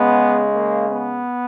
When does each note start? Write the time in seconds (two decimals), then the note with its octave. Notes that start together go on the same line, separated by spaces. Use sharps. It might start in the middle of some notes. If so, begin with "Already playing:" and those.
Already playing: C#3 G#3 B3
0.54 A#3
0.90 B3